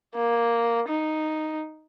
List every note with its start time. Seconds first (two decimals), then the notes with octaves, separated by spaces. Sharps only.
0.15 A#3
0.88 D#4